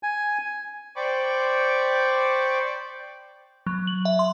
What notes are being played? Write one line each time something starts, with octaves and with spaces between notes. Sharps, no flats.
G#5
C5 D5 G5 B5 C#6 D6
F#3
F#7
E5
C6